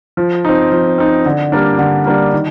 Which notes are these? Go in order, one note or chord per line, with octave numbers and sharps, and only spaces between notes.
F3
C4 D#4
F3
C4 D#4
D3
G3 A#3 D4
D3
G3 A#3 D4
D#3